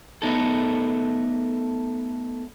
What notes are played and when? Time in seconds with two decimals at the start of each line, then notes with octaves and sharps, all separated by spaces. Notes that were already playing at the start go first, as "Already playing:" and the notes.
0.22 A3 B3 D#4 A4